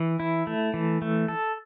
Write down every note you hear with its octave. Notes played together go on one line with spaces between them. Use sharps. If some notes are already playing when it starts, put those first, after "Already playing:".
Already playing: E3
E4
A3
E3
A3
A4